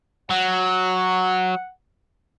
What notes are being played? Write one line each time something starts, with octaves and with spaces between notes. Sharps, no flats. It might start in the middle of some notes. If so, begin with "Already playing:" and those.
F#3 F#5